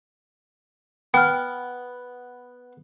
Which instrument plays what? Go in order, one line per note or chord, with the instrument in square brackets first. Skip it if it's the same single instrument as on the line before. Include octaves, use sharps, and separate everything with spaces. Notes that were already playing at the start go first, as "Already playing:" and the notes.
[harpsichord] B3 [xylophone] G5 F6